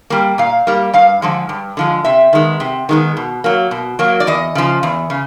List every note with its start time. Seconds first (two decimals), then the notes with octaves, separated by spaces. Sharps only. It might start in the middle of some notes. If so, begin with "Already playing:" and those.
0.10 G3 A#3
0.38 A#2 F5
0.67 G3 A#3
0.93 G2 F5
1.22 D3 F3 G#3
1.49 G2
1.77 D3 F3 G#3
2.05 C3 E5
2.33 D#3 G#3 B3
2.60 C3
2.89 D#3 G#3 B3
3.17 B2
3.44 F#3 A#3
3.71 B2
3.99 F#3 A#3
4.20 D5
4.27 E2 D#5
4.55 C#3 F3
4.83 E2
5.10 C#3